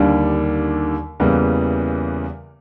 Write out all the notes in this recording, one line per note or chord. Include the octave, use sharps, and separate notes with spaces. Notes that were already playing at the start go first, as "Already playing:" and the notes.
Already playing: D#2 D3 G3 A#3 D4
E2 C#3 E3 G3 A#3